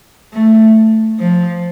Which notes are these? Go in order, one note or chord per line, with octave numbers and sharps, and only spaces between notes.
A3
F3